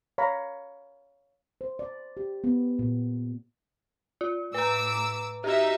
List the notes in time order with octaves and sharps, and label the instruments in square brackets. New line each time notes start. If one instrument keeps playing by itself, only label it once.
[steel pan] C#5 F5 A#5 B5
[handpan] C5
D5
G4
B3
A#2
[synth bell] F4
[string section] A2 D6 E6 [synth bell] B4 A#5
[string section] D#4 E5 [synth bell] F#4 G4